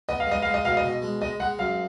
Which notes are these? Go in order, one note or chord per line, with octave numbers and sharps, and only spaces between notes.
B3 D#5
F5
G#3 D#5
G#3 F5
D#5
B2 F5
D#5
B2
G#3
G#3 D#5
G#3 F#5
F#2 F5